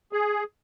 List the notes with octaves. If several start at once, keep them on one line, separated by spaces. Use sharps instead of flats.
G#4